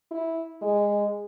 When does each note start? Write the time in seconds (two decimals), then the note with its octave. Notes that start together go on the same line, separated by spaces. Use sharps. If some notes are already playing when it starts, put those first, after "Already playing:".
0.11 E4
0.62 G#3